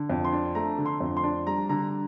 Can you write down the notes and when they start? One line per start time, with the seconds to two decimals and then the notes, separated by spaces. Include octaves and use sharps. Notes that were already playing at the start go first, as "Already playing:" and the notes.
Already playing: D3
0.10 F2
0.25 C6
0.33 D4
0.55 A3 A#5
0.78 D3
0.86 C6
1.01 F2
1.17 C6
1.24 D4
1.47 G3 A#5
1.69 D3 A#5